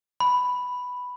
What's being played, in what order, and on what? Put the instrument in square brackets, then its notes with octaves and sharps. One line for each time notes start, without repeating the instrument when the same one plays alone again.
[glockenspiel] B5